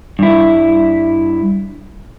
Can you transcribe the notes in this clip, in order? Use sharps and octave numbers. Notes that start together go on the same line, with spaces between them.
G2 E4